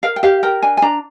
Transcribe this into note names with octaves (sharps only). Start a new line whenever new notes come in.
A#4 F5
G5
G4 F5
A#4 G5
D4 G#5
G#5
D4 A#5